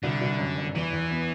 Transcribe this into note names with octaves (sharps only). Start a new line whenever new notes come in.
C2 D3
C2
F#2
G1
E2 E3
E2
B3